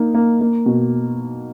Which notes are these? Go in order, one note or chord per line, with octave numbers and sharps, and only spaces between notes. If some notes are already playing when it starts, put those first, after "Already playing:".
Already playing: A#3 D#4
A#3
A#3
B2